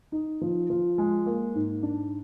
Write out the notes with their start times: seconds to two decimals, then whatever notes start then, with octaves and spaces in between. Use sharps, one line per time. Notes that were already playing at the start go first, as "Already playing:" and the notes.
0.12 D#4
0.41 F3
0.70 F3
0.98 G#3
1.26 A#3
1.55 G#2
1.83 D4